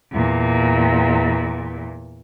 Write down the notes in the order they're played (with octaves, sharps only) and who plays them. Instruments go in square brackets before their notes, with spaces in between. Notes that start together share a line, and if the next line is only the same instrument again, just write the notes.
[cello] E2 A#2